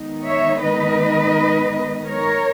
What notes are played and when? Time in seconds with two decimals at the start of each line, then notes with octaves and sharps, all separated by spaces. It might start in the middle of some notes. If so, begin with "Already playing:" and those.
Already playing: D#3 G#3 B3 D#4
0.26 C#5 E5
0.62 B4 D#5
2.07 A#4 C#5